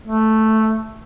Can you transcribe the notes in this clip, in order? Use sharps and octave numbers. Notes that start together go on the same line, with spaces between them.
A3